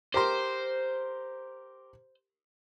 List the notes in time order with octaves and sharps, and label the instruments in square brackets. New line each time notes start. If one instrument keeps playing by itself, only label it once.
[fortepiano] G4 A#4 C6 [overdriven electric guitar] C5